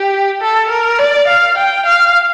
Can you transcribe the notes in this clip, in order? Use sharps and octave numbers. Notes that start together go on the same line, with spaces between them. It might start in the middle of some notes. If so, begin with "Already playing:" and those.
Already playing: G4
A4
A#4
D5
F5
G5
F5